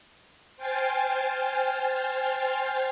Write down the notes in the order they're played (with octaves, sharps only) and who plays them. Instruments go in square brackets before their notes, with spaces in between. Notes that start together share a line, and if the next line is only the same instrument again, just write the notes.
[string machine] C5 G5 G#5 F6 A6 C7